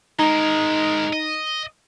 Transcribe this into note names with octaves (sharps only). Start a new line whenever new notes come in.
G#3 D#4 A#4
D#5